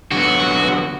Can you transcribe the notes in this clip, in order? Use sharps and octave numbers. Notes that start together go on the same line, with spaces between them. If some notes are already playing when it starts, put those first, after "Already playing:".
D3 F#3 B3 F#4